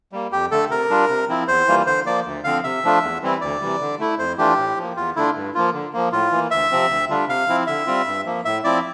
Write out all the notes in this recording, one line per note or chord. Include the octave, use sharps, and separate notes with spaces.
G3 A#3
F2 G4
D3 A3 A4
C3 A#4
G3 D4 F4
C3
F3 C4 E4
E2 C5
E3 G3 A#3 F4
D3 C5
F3 A#3 D5
D2
D3 F3 C4 F5
C3 E5
F3 A3 D4 F4
E2
E3 G3 C4 E4
D2 D5
C3 E3 G3
D3
A3 E4
F2 C5
E3 A3 D4 F4 G4
A2
F3
A#3
E2 F4
D3 A3 D4 E4 F4
G2
F3 A#3 F4
D3
F3 A#3
A2 F4
E3 A#3
D2 E5
C3 F3 C4
D2
D3 G3 D4 F4
C3 F5
F3 C4 E4
D3 E5
G3 C4 F4
G2
F3 A#3
A2 E5
F3 C4 E4 D5